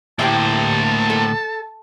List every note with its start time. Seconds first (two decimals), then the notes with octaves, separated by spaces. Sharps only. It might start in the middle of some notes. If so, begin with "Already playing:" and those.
0.19 D2 A2 A#3 E4 G4 C5 G5 A5
1.10 A4